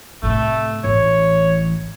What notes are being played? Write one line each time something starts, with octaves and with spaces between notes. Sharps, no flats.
A2 C3 A3
A1 E3 C#5